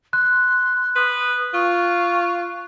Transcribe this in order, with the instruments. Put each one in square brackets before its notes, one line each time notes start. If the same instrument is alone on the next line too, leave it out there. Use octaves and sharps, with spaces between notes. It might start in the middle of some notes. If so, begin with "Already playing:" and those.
[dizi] C6 [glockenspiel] F#6
[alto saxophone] B4 [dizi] D#6
[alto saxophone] F4 [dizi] C#6